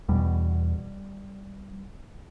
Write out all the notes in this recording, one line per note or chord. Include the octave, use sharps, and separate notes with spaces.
E2 B2 G3